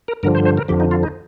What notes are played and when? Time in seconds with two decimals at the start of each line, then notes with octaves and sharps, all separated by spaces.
0.08 A#4
0.23 G2 D3 F3 A#4
0.35 C5
0.45 C5
0.58 A#4
0.68 F2 D3 F3 G4
0.80 D#4
0.91 F4
1.03 D#4